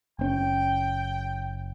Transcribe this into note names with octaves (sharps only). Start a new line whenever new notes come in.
F#1 C4 C#4 G5